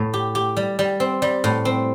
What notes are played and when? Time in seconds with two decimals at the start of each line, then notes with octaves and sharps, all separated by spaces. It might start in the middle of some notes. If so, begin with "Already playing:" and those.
Already playing: A2
0.14 G4
0.35 G4
0.57 G3
0.79 G3
1.00 C4
1.22 G3
1.44 A2
1.65 C4